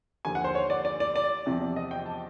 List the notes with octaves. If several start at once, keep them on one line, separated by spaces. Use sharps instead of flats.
D#2 D3 F3 G#5
F#5
C5
C#5
D5
D5
D5
D5
E2 C3 F3
D#5
G5
A5